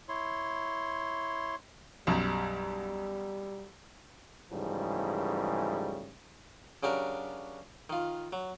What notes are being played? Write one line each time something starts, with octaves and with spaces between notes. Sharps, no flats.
E4 C#5 C6
B1 F#2 G3
G#2 C#3 E3 F3 G3 A3
C#3 F#3 D4 G4 A#4
D#3 F4
F#3